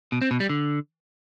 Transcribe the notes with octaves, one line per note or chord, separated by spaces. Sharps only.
B2
C4
B2
G3
D3